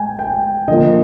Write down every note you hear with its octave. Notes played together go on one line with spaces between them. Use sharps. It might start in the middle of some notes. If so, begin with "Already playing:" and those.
Already playing: G#3 G5 G#5
G5
D3 F3 A#3 D#5